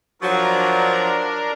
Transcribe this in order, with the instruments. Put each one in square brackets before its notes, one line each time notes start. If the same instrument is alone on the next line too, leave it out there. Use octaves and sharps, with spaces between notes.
[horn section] F3 F#3 [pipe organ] D4 A#4